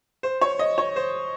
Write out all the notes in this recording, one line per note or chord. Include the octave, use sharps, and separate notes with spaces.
C5
C#5
D#5
C#5
C5